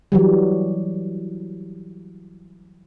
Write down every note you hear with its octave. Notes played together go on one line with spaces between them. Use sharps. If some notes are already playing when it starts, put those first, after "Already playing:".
E3 F#3 G3